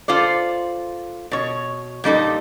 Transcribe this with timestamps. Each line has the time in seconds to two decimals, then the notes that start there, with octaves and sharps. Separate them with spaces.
0.08 F4 A4 C5 D5
1.31 B2 C#5
2.04 A#2 G3 D#4 A4